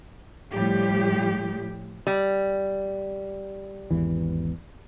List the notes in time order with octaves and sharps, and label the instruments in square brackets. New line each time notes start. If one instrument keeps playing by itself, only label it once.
[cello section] A2 F3 G3 G4
[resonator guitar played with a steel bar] G3
[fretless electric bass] G#1 E2 E3